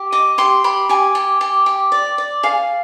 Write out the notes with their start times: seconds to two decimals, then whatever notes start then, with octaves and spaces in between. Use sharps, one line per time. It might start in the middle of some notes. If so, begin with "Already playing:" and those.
Already playing: G4
0.12 D#5 D6
0.38 G4 C6
0.64 G4 B5
0.89 G4 G#5
1.15 G4
1.41 G4
1.66 G4
1.92 D5
2.18 D5
2.43 G#4 F5